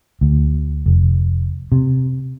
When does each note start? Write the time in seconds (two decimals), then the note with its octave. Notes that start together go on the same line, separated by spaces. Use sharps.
0.21 D2
0.86 F1
1.72 C3